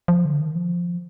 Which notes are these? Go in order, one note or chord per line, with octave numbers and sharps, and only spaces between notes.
F3
D3
D#3
F3